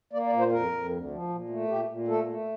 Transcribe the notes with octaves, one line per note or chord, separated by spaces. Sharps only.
A#3 D5
D5
A#2
C5
F2 A#4
F2
D2
F3
A#2
A3
A#2 G4
A#2
A3 A4
A3